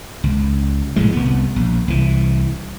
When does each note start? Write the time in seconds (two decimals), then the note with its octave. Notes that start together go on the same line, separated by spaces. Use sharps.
0.24 C#2
0.96 A#1 A2 G#3
1.12 C2 B3
1.56 A#1
1.88 C2 E3